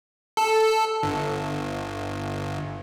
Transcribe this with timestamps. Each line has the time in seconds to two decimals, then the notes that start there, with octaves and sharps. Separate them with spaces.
0.37 A4
1.03 G1